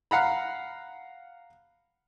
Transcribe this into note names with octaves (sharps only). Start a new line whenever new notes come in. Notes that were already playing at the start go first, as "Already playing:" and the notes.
F5 F#5 A#5 B5